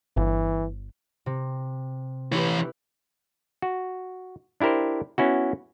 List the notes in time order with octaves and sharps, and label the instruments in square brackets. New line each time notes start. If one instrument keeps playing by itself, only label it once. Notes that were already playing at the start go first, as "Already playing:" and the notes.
[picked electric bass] G1 [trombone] E3
[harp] C3
[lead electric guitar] E3 C#5 [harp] E4 G4 B4
[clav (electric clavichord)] F#4
D4 E4 G4 A#4 C5
B3 C#4 E4 F#4